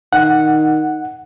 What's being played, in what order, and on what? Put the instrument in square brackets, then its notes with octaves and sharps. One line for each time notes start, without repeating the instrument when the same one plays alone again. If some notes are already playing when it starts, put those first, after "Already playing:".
[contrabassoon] D#3 [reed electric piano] F#5